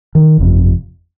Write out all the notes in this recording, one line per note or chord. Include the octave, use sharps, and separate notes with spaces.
D#3
G1 F2 C3